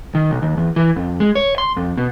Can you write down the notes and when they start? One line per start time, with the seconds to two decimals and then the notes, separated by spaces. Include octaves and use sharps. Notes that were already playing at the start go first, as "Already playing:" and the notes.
0.15 D#3
0.30 B1
0.42 D#2
0.57 E2
0.76 E3
0.96 F2
1.20 G#3
1.35 C#5
1.58 C6
1.77 F2
1.97 B2